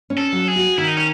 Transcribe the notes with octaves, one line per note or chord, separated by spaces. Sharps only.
C#4
A4
F#3
G#4
F#4
D#3 E4
D#4
C#4